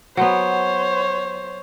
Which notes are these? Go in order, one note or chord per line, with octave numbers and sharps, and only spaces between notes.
F#3 B3 C5 C#5